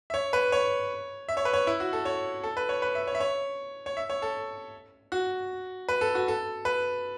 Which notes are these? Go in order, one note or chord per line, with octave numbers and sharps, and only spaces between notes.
E5
C#5
B4
C#5
E5
C#5
B4
C#5
E4
F#4
A4
C#5
A4
B4
C#5
B4
E5
C#5
E5
C#5
C#5
E5
C#5
A4
F#4
B4
A4
F#4
A4
B4